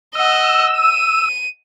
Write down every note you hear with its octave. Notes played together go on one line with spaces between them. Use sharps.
D#5 F#5 E6
D#7